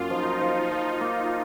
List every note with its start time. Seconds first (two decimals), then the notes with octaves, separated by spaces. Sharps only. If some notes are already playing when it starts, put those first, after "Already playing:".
Already playing: F#2 A#3 F4
0.10 F3 D#4
0.41 F3
0.71 F3
1.01 A#3